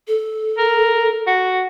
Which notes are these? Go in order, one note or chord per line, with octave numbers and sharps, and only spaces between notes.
A4
A#4
F#4